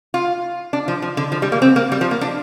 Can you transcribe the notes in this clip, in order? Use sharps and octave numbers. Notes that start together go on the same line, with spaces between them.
F4
D4
F3
F3
D3
F3
G3
A#3
C4
A#3
G3
F3
A#3
D4